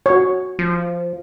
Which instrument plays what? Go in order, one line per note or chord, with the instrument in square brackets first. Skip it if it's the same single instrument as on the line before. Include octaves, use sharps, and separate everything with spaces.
[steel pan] F#4 C#5
[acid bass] F3